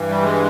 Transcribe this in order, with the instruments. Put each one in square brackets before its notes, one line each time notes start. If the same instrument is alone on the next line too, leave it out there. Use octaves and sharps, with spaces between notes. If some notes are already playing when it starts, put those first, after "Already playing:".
Already playing: [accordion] G2 E3
G3
G#3